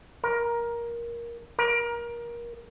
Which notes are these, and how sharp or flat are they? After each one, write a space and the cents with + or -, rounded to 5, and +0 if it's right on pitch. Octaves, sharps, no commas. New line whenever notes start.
A#4 +15
A#4 +25